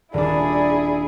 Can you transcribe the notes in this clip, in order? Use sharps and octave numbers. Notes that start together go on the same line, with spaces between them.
D#1 D4 E4 G#4 D5